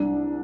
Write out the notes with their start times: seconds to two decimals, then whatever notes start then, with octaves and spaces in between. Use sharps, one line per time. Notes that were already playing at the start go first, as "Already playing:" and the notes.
Already playing: C2 D4